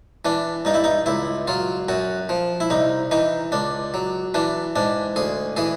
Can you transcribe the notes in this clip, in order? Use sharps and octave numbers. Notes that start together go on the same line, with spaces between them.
E3 D4
G2 D#4
E4
D#4
C#2 E4
F#3 F4
F#2 F#4
F3
E4
C2 D#4
E3 D#4
C#2 D4
F#3
E3 D4
G#2 D4
D2 G#4
E3 G#4